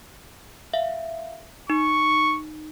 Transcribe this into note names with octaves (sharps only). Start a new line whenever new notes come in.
E5 F5
D#4 C#6